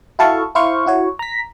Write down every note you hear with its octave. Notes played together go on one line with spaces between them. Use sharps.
E4 F#4 A4 F5 A5 C#6
E4 C5 F5 C#6
E4 F#4 C#5
A#5 B6